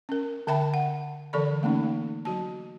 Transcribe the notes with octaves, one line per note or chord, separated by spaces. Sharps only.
C#4 A#4
D3 A#4 E5 G5 A5 B5
F#5
D3 E3 A4 D5 B5
A3 A#3 C#4 D#4
F#3 F#4 A5